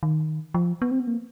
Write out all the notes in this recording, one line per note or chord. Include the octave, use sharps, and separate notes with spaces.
D#3
F3
B3
C4
B3
A#3